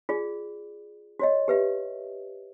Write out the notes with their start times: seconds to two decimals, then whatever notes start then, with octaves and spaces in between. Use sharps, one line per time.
0.09 F4 G#4 D5
1.19 F#4 C#5 D#5
1.48 G4 B4 E5